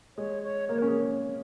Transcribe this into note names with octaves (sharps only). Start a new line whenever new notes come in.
G#3 C#5
C#5
A#3 C#5
C#4 A#4
G#4